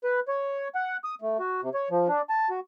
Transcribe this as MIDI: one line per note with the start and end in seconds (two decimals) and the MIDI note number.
0.04 0.20 71
0.28 0.68 73
0.75 0.97 78
1.04 1.15 87
1.22 1.37 57
1.39 1.61 66
1.62 1.69 48
1.74 1.89 73
1.91 2.08 53
2.08 2.22 62
2.30 2.49 81
2.50 2.60 66